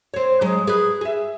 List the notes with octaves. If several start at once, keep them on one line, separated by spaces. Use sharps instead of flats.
C4 C#5
F#3 G#3
G#4 B4
G#4 E5